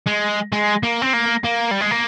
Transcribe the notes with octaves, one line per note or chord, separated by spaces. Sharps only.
G#3
G#3
A#3
C4
A#3
A#3
G3
G#3
A#3